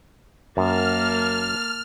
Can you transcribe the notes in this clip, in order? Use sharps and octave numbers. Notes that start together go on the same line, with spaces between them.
F#2 A#3 A5 F6